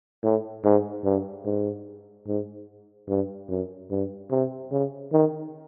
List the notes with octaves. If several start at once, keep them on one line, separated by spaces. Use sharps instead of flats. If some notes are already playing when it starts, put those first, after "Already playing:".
A2
G#2
G2
G#2
G#2
G2
F#2
G2
C3
C#3
D#3